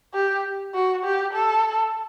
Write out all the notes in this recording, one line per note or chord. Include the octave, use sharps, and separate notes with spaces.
G4
F#4
G4
A4